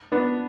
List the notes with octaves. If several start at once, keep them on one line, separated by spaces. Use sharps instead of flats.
B3 D4